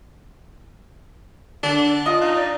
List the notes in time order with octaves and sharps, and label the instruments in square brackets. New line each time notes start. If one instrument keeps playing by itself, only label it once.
[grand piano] D3 [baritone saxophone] D4
[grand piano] F4 D#5 D#6
[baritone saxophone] D#4
[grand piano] D5